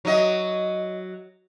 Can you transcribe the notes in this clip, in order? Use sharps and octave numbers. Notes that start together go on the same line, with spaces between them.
F#3 D#5